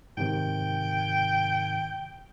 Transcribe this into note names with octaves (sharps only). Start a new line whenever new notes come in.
G#2 C3 D#3 G5